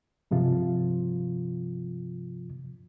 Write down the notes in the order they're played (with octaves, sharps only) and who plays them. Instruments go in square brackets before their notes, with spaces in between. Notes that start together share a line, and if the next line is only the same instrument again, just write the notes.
[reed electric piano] G2 C3 F3 F4